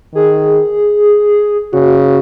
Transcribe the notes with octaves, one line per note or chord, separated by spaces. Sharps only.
D#3 G#4
C#3 F#4